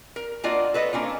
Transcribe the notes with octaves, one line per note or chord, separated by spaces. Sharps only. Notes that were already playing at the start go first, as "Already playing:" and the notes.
A#4
A#3 D4 F4 F#4 D5 D#5
A4 B4 C#5 D#5
A#3 C#4 D4 F4